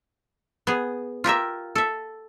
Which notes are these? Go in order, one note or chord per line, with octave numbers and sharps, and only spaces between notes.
B3 G#4
F4 G4 A#4 E5
A4 E5